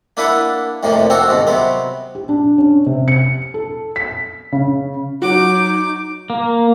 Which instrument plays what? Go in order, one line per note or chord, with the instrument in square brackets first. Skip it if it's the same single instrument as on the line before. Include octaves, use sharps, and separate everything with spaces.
[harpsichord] A#3 D4 E4 B4 F#5 A5
F2 A2 C3 F3 A#3
C4 D4 F#4 A4 C5
C#2 G#2 B2 D#3
C3 F#3 B3 C4
[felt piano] G4
D4
C#4
C3
C#7
A4
B6
C#3
[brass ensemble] F#3 [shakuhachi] D#4 [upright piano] F#4 [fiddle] D6
[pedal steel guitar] A#3